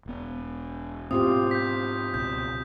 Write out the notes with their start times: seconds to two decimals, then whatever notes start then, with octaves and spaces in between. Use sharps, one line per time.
0.06 E1 B3
1.11 G#2 B2 C4 F4 G4 D#6
1.51 G6 B6
2.14 C#2 B2 G6